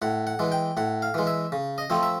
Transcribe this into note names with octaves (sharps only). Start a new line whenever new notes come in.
A2 F#5
F#5
E3 G#3
G5
A2 F#5
F5
E3 G#3
E5
C#3
D#5
F3 A3 C4
E5